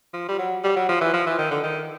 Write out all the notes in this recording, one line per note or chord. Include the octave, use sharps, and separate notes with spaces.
F3
G3
F#3
G3
F#3
F3
E3
F3
E3
D#3
D3
D#3